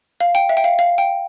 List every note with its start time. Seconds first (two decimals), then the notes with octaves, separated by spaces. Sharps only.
0.20 F5
0.35 G5
0.49 E5
0.57 G5
0.64 F5
0.79 F5
0.98 G5